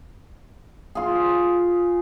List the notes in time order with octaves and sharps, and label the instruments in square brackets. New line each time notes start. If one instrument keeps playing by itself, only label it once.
[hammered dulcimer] F4 G#4